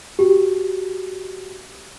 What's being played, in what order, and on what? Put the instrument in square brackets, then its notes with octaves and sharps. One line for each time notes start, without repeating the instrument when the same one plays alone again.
[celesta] F#4 G4